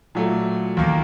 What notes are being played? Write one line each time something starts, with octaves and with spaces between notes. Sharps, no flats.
A#2 F#3 A3
D#2 D#3 A#3